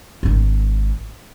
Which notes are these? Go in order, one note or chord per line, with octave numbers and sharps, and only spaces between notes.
G#1 D4